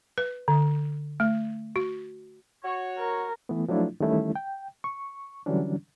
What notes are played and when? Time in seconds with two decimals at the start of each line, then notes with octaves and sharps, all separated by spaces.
0.18 B4
0.48 D3
1.20 A3
1.76 F#4
2.64 F#4 C#5
2.99 A#4
3.49 E3 A3 B3
3.68 F3 F#3 A3 D4 E4 F4
4.00 D#3 E3 G3 A3 C#4 E4
4.36 G5
4.84 C#6
5.46 D3 E3 F#3 G3 C#4 D4